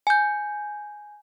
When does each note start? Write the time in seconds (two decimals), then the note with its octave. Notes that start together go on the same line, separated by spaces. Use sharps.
0.07 G#5 G6